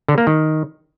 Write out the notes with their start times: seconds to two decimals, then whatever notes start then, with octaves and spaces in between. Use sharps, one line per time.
0.08 D3
0.18 A#3
0.27 D#3